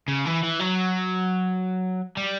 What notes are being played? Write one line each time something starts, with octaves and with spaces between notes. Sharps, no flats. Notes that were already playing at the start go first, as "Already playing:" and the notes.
C#3
E3
E3
F#3
G3